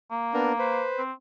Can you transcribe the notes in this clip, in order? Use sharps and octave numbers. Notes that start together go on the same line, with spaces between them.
A#3
B3 D4 A#4
B4 C5
C4